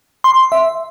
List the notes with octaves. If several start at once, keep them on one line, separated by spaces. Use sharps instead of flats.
C6
E5